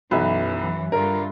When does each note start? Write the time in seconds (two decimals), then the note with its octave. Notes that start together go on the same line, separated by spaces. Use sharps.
0.11 B1 F#2 E3 B4 E5
0.92 G2 D3 F4 A#4